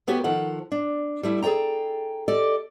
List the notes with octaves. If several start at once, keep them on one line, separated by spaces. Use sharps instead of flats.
A3 B3 F#4 G4 C#5
D#3 F3 A4 F#5
D4
G3 A3 E4
G#4 A4 D5 G5 A#5
G4 A4 D5 D#5